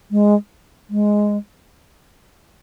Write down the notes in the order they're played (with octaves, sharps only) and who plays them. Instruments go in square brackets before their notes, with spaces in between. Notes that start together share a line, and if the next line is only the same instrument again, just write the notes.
[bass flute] G#3
G#3